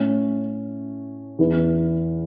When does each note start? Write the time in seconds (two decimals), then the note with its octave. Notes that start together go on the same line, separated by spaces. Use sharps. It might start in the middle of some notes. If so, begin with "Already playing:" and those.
Already playing: A2 A3 C#4
1.39 E2 E3 B3 E4